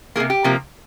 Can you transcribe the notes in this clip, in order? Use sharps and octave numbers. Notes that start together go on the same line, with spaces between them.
C3 F3 A#3 G#4
G4
C3 F3 A#3